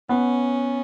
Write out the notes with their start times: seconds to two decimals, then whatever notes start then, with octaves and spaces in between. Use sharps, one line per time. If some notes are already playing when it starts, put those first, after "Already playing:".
0.09 B3 C#4